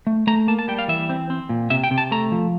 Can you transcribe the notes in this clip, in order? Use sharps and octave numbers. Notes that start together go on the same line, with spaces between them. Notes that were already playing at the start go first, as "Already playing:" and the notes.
A3
A3 A#5
A#3 A5
A5
G3 G5
F5
E3 E5
C4
C4
A#2
C3 E5
G5
C3
A5
A3 A#5
F3